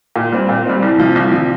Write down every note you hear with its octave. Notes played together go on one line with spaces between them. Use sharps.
A#2
G3 C4
A#2
G3 C4
C2
C3 F3
C2
C3 F3